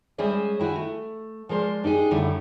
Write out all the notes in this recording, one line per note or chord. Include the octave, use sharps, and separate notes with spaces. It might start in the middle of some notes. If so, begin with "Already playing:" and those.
G3 G#3 C#4 G#4 C5 E5
D#3 E4 F#4 G#5
A3
F3 G#3 A#4 C5 D5
D4 D#4 G4 G#4
F#2 D3 G3 A3 E4